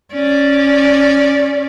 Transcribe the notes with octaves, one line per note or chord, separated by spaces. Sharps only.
C#4 D5